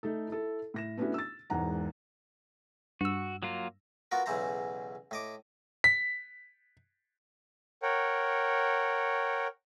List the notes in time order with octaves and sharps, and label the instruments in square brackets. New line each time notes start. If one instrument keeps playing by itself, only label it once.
[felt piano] A3 D#4 A4
E4 A4
A2 A#6 E7
A3 B3 C#4 D4 E4 F#4
E6 A6
E1 E2 G#2 F#5 A#5
[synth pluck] G2 E6 [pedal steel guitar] F#4
[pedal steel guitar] F#3 A#3 F4
[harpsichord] B3 F4 F#4 A#4
B1 E2 C#3 E3 C5 A#5
A2 D#5 D6
[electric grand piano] B6
[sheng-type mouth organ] A#4 C#5 F#5 G5